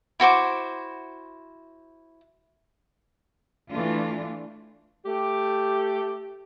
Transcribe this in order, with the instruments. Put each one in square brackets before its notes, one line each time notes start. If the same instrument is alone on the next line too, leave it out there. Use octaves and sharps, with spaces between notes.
[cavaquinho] E4 F#4 C5 D6
[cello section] E3 A3 D4 F4
[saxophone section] A3 G4